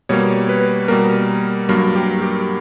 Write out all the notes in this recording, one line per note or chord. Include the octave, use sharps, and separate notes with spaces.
B2 G3 A#3 C#5
B4
B2 G3 A#3 A#4
G2 F#3 A#3 A#4
G4
G4